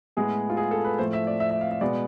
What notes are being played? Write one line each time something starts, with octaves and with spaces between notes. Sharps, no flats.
A2 G#3 B3 G#4
F4
G#4
A4
B4
A2 F3 A3 C5
E5
D5
E5
E5
F5
E5
B2 G#3 B3 D5